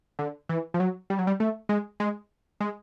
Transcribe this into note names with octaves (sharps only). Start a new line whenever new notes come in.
D3
E3
F3
F#3
G3
F#3
G3
A3
G#3
G#3
G#3